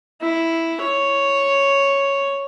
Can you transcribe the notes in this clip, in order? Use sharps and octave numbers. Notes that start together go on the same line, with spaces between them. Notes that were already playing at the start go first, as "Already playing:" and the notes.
E4
C#5